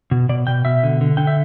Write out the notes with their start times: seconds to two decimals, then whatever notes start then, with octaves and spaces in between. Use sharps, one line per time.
0.11 B2
0.29 B2 D5
0.47 B2 G5
0.65 B2 E5
0.83 D3
1.01 D3
1.17 D3 G5
1.27 E5